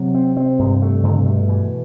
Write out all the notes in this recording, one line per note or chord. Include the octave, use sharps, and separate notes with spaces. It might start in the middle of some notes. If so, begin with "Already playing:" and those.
Already playing: C3 F#3
C4
C4
G2
A3
G2 D3
C3
B2 A3
E3